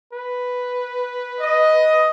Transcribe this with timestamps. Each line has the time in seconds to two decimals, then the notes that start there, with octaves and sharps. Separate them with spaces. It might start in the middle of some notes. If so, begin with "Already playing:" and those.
0.13 B4
1.40 D#5